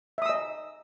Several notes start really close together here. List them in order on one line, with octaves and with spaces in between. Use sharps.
E5 D#6 E6 D#5